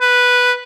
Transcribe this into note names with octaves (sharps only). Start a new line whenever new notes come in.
B4